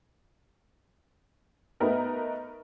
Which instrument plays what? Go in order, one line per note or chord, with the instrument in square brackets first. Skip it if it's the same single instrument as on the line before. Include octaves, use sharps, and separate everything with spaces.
[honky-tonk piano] A3 B3 D#4 A#4 B4